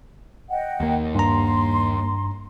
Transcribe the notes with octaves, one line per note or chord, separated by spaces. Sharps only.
D#5 F#5 G5
D#2 A#3
G2 A#5 C6